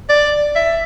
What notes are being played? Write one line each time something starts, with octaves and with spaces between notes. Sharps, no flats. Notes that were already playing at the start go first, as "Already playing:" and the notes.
D5
E5